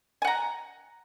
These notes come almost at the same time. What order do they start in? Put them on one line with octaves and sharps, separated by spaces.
G#5 F#5 A#5